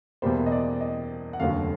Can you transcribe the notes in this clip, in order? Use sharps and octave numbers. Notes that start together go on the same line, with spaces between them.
E2 B2 G3 A#3 C5
D#5
D5
D#5
F#5
F1 D#2 D3 F#3 F5